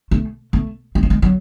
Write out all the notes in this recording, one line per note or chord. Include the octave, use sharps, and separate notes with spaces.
A3
A3
G#3
A3
G#3
F#3